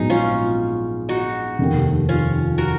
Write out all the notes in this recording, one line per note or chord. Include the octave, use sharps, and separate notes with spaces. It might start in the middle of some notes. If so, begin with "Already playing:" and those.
Already playing: A#1 G#2 F#3 B3 D#4 G#4
C#4 F4
D#4 F#4
F1 D#2 D#3
C#4 F4
F#4 A#4